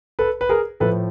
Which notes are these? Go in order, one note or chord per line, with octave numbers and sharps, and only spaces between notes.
A4 B4
B4
G#4 A#4
A2 F3 A3 A4 B4